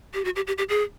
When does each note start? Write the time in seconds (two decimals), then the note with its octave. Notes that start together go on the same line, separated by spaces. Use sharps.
0.14 G4
0.25 F#4
0.36 G4
0.47 G4
0.58 G4
0.69 G#4